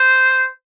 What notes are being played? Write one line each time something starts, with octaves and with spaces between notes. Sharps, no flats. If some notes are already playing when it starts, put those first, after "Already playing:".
Already playing: C5